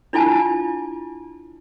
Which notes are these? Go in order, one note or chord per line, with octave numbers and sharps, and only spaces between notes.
D4 E4 F4 G#5 A5